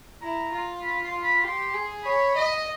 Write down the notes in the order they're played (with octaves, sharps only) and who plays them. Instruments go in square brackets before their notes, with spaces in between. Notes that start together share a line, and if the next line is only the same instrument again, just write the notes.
[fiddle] E4 [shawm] A#5
[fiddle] F4
[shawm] B5
C6
B5
[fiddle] G4 [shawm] C6
[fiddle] G#4
[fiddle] C#5 [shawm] B5
[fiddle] D#5